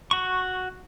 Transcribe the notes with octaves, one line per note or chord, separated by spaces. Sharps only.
F#4 C#6